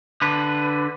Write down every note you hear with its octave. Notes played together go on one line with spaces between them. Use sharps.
D3 B4